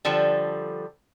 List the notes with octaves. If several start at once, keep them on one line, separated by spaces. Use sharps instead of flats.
D3 F3 G3 A4